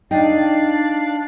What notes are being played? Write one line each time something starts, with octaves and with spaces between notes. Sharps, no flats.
D4 D#4 D5 F5 G5